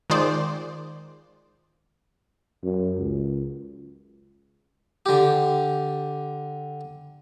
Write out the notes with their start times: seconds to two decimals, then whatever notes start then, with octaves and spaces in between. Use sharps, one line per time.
0.10 D#3 G#3 F4 G#4 C5 D5
2.63 F#2
2.97 C#2
5.06 D3 G4